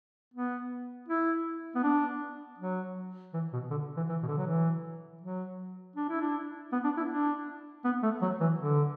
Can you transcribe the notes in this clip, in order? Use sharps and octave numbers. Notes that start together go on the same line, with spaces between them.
B3
E4
B3
D4
F#3
E3
B2
D3
E3
E3
B2
D3
F#3
E3
F#3
D4
E4
D4
B3
D4
E4
D4
B3
A3
F#3
E3
D3